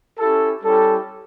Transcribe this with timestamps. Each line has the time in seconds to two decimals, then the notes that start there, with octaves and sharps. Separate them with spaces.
0.19 C#4 E4 G4 A4
0.63 G3 C#4 E4 G4 A4